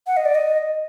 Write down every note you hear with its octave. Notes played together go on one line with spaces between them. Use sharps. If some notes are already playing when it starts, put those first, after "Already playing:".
F#5
D#5
D5
D#5